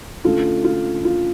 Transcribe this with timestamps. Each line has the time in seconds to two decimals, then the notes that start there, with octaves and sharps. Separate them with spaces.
0.24 D3 A3 C#4 F4 A4
0.64 F4
1.05 F4